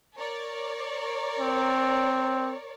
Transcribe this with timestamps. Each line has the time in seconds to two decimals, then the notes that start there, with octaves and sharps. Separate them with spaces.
0.16 A#4 C#5 D5
1.39 C4